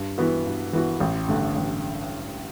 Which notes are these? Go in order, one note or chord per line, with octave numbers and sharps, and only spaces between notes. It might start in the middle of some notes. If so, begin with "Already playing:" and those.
Already playing: G2
E3 B3 F#4
G2
E3 B3 F#4
A1
G2 D3 A3
A1